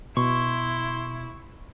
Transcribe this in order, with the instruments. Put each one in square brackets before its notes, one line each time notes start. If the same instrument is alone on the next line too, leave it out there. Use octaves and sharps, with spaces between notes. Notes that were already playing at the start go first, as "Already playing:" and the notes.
[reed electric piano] B2 [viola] E4 [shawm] C6 [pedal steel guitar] C#6